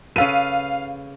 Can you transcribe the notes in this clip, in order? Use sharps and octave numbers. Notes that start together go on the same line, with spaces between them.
C#3 A4 B4 F5 D#7